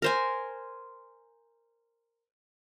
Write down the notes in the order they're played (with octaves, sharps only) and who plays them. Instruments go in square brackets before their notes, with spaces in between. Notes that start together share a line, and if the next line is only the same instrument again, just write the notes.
[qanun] A#4 C5 G#5